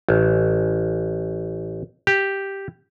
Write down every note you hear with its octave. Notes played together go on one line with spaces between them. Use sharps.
A1
G4